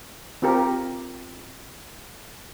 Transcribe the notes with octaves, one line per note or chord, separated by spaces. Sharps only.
C4 F4 G4 A#4